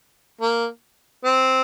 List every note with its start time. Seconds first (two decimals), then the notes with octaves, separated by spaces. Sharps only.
0.41 A#3
1.24 C4